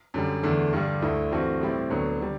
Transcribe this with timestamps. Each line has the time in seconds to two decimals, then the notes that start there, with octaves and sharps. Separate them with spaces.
0.14 F#2 D3 G3
0.43 E2 D3 A3
0.73 G2 D3 G3
1.02 D2 D3 A3 E4
1.32 G2 E3 A3 C4 F#4
1.61 A2 G3 C4 E4
1.90 D2 D3 F#3 B3
2.22 D3 G3